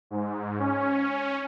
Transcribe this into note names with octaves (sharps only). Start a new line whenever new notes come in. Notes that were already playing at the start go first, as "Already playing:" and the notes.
G#2
C#4